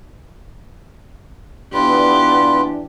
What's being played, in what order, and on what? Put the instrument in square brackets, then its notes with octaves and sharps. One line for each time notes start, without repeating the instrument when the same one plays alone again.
[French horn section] E3 D4 D5 [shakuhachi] B3 [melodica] F4 B4 [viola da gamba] G4